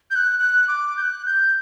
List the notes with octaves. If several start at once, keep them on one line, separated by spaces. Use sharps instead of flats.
G6
F#6
F#6
D6
G6
F#6
G6